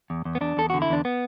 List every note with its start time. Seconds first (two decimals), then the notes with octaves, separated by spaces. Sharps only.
0.10 E2
0.25 E2
0.35 B3
0.41 E2 D4
0.57 E2 A4
0.70 D3 F#4
0.82 E4
0.89 E2 D4
1.05 B3